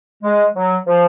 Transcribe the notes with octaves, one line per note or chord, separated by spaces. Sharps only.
G#3
F#3
F3